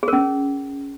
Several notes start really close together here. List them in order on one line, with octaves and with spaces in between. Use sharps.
G#4 A#4 C#4